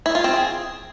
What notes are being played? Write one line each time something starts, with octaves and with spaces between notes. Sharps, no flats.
E4
F4
C4
G#4